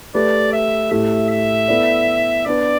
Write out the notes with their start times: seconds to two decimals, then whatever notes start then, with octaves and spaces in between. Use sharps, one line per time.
0.14 A3 G4 B4 D5
0.53 E5
0.91 A2 A3 G4 E5
1.30 E5
1.68 B3 E4 A4 D5
2.46 B3 D4 B4 D5